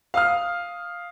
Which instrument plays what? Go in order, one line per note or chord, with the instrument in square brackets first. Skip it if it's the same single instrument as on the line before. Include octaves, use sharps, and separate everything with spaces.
[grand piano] F5 D#6 F6